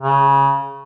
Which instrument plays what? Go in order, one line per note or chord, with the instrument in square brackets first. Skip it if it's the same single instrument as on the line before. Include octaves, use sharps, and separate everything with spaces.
[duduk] C#3